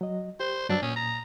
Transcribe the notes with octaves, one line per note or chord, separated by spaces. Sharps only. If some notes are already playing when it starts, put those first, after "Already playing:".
F#3 D#5
G4 C5
G2 F#3 D4 E6
A#2 C#4 D#6
A#5